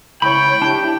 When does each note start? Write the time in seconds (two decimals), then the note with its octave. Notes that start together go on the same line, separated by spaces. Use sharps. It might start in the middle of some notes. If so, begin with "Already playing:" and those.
0.22 C#2 E4 C#5 G5 B5
0.62 D4 E4 G4